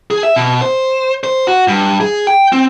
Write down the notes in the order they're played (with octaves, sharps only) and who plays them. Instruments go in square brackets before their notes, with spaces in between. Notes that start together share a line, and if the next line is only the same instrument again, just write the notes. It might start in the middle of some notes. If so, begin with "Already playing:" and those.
[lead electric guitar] G#4
E5
B2
C5
C5
F#4
G2
G#4
G5
C4